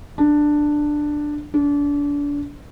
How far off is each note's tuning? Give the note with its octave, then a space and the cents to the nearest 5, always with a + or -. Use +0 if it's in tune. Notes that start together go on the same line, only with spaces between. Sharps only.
D4 +10
D4 -30